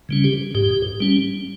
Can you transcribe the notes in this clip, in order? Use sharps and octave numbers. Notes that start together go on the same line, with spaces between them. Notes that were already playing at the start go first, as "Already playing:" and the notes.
C#3 G3 C#4
G4
G#2 G4
G3 C#4